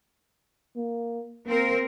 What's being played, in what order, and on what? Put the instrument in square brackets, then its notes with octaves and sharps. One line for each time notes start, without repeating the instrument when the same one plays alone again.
[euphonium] A#3
[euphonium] A#3 [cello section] C4 A#4